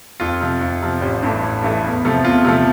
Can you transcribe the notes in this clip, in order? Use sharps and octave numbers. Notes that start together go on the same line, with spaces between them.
F2 F4
C3 F3
F2
C3 F3
A1 G4
G2 E3 A3
A1
G2 E3 A3
E2
C3 F3 A3
E2 F4
C3 F3 A3